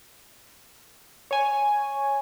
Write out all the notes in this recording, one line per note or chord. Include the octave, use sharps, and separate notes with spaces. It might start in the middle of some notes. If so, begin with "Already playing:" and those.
C#5 G#5